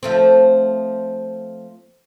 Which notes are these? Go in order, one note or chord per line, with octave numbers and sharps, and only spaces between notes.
F3 A3 C4